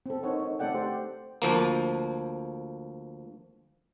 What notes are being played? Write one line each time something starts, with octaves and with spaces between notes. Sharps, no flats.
C4 A4
D#4 A#4 C5 C#5 F#5
D#4
A3 C4 A4 D5 F#5 G5
G4 C5
D2 F3 A#3